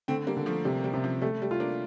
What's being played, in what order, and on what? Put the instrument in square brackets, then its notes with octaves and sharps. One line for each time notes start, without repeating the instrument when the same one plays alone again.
[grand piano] D3 [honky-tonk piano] A3 C4
[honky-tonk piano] G3 A#3
[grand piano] D3
[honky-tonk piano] F3 A3
[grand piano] C3 [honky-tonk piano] G3
[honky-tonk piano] G3
[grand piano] C3
[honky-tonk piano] F3
[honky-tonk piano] G3 [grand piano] A3
[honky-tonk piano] G3
[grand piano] F4
[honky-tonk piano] A#3 D4